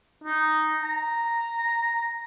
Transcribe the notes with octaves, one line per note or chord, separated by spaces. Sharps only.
D#4
A#5